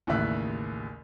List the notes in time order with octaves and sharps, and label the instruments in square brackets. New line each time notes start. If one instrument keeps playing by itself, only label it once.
[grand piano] A1 D#2 C#3 D5 E5 F#6